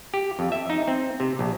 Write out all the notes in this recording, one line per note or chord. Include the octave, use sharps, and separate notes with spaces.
G4
F2
E5
D#4
C4
C3
A#1